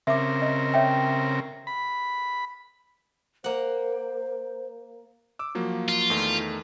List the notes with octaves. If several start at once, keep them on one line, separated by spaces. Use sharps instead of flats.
C#3 C4 A#4 E5 D6
D#5
C#5 E5 G5
B5
A#3 C5 F#5
D6 E6
F3 F#3 A#3
F4
E2 D#3 A3